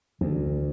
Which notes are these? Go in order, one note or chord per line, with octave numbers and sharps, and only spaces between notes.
D2